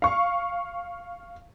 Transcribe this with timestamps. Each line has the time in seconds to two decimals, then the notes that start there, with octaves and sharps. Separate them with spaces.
0.02 F5 C#6